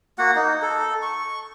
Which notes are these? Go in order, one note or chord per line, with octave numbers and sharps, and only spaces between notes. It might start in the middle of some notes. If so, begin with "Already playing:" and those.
A#3 F#4 F#5
D#4
A4
C#6